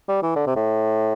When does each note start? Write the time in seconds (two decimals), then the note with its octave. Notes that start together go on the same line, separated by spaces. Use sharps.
0.08 G3
0.23 E3
0.36 D3
0.47 C3
0.56 A2